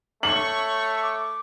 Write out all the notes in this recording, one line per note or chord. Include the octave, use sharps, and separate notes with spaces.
A3 C#5 C#6 F#7
D6